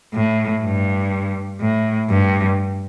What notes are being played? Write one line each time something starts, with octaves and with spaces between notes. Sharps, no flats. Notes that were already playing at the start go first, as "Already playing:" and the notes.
A2
G2
A2
G2